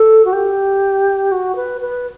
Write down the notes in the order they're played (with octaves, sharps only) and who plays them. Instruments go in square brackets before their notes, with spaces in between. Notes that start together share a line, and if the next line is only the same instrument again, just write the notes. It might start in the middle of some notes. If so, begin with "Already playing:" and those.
Already playing: [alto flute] A4
F#4
G4
F#4
B4
B4